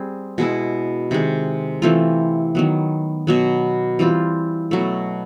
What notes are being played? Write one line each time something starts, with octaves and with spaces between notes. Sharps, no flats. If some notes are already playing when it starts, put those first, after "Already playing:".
Already playing: G3 C4 G#4
B2 G#3 B3 E4
C3 D#3 G#3
E3 A3 C4 F4
D#3 F#3 B3
B2 F#3 B3
E3 G3 C4 F4
B2 F#3 A3